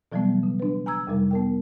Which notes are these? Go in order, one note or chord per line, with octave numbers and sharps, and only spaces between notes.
B2 E3 F#3 G3 A3 B3
C#3
D4 B4
G#5 A#5 E6 G#6
F2 C3 G3 A#4
B3 A#4 G5